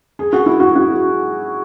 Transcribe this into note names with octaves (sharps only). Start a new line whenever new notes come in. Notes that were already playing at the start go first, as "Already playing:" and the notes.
G#4
F#4
E4
F#4
F#4